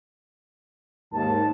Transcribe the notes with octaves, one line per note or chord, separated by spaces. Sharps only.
D#2 G#2 A5